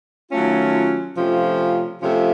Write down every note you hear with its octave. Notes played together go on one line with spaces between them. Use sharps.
D#3 F#3 A3 C#4 F4
C3 F3 A3 C#4 F4
C3 F3 A3 C#4 F4